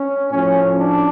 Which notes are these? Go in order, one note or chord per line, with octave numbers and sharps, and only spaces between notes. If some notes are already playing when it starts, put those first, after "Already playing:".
Already playing: C#4
A2 F3 C#4
D4